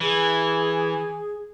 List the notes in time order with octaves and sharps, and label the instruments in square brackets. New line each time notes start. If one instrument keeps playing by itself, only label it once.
[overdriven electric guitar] E3 [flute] G#4